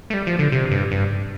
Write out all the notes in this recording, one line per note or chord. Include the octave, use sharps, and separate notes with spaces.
A3
G3
F3
D3
C3
G2
G2